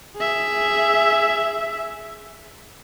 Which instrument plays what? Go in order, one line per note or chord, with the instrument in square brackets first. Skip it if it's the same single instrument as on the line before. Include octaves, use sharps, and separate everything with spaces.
[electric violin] G#4 E5